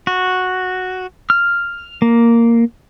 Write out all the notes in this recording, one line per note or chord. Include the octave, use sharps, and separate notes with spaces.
F#4
F6
A#3